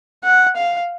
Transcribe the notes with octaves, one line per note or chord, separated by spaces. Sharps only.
F#5
F5